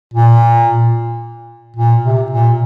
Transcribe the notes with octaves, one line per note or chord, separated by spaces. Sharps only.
A#2
A#2
C3
A#2